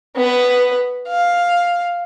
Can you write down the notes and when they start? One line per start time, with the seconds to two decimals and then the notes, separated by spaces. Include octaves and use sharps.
0.16 B3 B4
1.08 F5